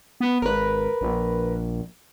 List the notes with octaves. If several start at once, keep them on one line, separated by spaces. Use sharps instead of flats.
B3
G#1 A#4 B4
A#1